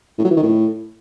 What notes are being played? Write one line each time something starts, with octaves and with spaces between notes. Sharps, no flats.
A2
F#3
E3
D#3
A2